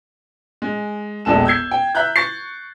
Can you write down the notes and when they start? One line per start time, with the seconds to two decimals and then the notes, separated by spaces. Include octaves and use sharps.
0.62 G#3
1.25 E1 A#1 G#3 A4 E7
1.45 E6 G6 G#6 C7
1.71 G5
1.95 E5 A#5 F#6 G6
2.16 C#6 A6 C7